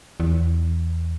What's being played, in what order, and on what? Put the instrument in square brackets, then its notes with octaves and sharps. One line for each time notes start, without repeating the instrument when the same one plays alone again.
[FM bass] E2